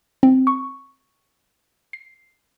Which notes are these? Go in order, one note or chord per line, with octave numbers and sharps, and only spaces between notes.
C4
C#6
C7